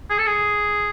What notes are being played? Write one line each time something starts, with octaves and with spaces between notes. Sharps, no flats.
G#4
A4
G#4